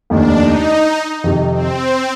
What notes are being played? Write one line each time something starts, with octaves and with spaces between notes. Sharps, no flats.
F1 D#2 D#3 D4
D#4
F2 C3 D#3
C4